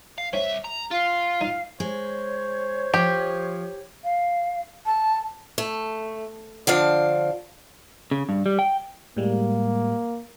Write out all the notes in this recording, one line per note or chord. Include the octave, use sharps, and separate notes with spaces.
F5
C2 C4 C#4 E5
A#5
F4 F5
D#4 D#5
G#3 C5 C#5
F3 G4
F5
A5
A3
D3 F3 D4 F5
C#3
G2
G3
G5
A2 G3 G#3 A#3